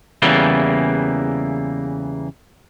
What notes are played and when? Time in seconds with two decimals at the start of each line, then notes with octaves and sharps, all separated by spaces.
0.22 E2 C#3 E3 G3 A#3